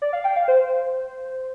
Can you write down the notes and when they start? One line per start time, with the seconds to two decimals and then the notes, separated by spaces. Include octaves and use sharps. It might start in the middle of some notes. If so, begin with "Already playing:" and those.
0.02 D5
0.13 F5
0.24 G5
0.36 F5
0.48 C5